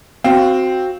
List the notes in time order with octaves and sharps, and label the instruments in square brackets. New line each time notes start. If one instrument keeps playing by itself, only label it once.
[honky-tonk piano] C4 [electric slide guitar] F#4 F5